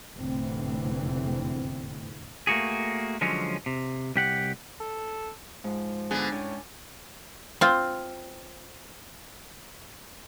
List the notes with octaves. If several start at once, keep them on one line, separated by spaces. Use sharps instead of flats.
F1 E2 A2 D3 E3 C4
A3 A#3 F#4 G#4
D3 F3 F#3 G#3 C#4
C3
C2 G4 F#5
A4
G#2 F3
D3 B3 G#4
A2 C#4
C4 F4